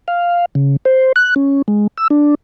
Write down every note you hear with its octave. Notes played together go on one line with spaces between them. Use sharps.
F5
C#3
C5
F#6
C#4
G#3
E6
D4